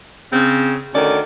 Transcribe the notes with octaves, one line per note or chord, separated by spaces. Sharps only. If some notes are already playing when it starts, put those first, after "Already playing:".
C#3 C4
D2 D3 D#3 C#4 D5